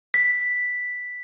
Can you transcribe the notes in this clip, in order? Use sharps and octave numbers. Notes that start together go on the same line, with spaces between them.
B6